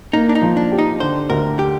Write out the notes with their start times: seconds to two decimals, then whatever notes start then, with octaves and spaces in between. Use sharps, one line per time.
0.13 A#3 D#4
0.29 D4
0.35 D#4
0.42 F3
0.57 D4
0.72 G4
0.79 D#4
1.00 D3 C5
1.30 D2 A#4
1.59 G4